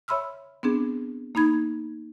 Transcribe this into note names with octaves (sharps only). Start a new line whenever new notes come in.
C#5 E5 B5 C6 E6 F6
B3 C4 D4 G#4
A#3 D#4 B5 G#6